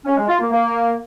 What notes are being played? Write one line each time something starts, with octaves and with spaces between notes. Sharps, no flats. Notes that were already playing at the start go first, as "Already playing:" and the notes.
C#4
G#3
F4
A#3
A#3